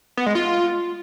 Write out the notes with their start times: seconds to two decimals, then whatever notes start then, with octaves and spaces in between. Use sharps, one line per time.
0.17 B3
0.26 G#3
0.35 F4